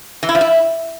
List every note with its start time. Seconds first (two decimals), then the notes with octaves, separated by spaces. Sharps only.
0.23 E3
0.29 E4
0.35 F3
0.41 E4